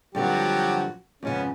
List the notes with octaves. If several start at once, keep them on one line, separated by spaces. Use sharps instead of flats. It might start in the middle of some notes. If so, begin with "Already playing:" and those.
G2 D3 F3 F#3 C4 F#4 G4
F2 G#2 C#3 B3 C#4